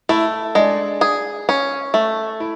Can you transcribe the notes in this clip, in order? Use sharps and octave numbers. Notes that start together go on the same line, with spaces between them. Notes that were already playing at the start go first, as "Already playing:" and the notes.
A3 E4
G#3 D4
G#4
C#4
A3
E4